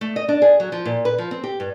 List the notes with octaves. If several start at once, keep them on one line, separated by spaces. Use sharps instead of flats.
A3
D#5
D4
G#4
F#3
F3
A#2
B4
F3
C4
G4
G2